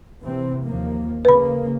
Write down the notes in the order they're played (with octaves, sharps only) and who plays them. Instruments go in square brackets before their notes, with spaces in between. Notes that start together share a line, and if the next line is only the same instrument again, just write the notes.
[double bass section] C3 E3 C4
D#2 F3 A#3
[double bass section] C#3 A#3 [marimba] B4 B5